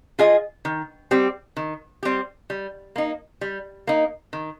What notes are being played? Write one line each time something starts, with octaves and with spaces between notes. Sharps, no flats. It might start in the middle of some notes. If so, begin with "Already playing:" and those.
F4 G#4 D#5
D#3
G3 C4 G4
D#3
G3 C4 G4
G3
A#3 D#4
G3
A#3 D#4
D#3